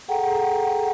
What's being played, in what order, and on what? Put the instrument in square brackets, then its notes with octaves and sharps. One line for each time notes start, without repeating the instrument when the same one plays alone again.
[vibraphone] G#4 A4 F#5 G5 A#5